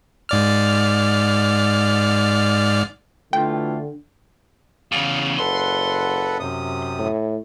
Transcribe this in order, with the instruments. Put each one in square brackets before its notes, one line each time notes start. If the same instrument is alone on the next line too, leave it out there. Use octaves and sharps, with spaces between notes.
[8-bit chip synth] G#2 D5 F6
[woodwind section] B2 E3 F4 [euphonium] D3 [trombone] A3 [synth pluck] G5
[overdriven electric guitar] E2 C#3 [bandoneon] F5
[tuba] F#1 [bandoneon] A4 B4 F#5 [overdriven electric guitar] C6
[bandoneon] F#2 C3 D#6
[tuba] A2